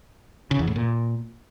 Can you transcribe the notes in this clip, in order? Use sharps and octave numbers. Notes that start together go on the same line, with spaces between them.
C#3
E2
A2
A#2